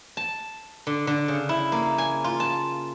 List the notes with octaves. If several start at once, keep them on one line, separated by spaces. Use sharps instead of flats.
A5
D3
D3
C#3
E4
A#3
G#5
F4
A5